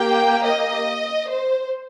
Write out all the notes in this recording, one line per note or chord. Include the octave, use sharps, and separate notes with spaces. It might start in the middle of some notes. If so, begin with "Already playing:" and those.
Already playing: A#3 G4 G5
D#5
C5